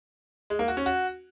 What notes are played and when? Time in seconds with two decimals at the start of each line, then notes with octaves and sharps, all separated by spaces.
0.50 G#3
0.59 A#3
0.68 F#4
0.77 C#4
0.86 F#4